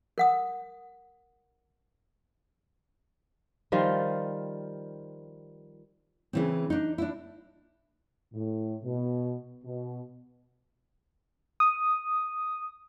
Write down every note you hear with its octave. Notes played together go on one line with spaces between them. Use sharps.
A#4 F#5 D#6
D#3 F3 G3 F4
C#3 E3 C4
D4 D#4
D4 E4
A2
B2
B2
D#6